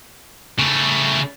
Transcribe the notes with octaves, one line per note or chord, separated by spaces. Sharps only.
C#3 A3